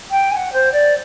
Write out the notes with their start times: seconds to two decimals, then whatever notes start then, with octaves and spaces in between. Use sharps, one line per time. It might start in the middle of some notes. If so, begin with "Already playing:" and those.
0.10 G5
0.31 G#5
0.35 F#5
0.52 C5
0.72 D5